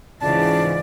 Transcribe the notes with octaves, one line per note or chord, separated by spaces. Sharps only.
C#2 G#2 C#3 E3 D5 A5